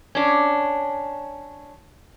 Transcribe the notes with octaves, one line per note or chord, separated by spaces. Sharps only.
C#4 D4